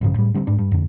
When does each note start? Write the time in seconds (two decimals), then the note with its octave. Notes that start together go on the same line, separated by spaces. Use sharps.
0.01 A1 G2 C#3 F3
0.16 A2 G3
0.34 D3 G3 A#3 C4
0.47 G#2 D4
0.59 G2
0.72 F2 D3